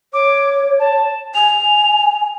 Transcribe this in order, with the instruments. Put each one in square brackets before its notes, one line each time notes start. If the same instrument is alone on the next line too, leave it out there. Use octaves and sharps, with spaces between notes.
[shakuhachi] C#5 [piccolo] D6
[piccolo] A5
[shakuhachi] G#5 [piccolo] F7